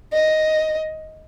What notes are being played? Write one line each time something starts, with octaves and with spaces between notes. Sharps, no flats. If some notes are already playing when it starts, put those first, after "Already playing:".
D#5